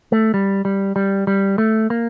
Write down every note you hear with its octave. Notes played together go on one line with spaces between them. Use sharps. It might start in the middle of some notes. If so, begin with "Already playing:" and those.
A3
G3
G3
G3
G3
A3
A#3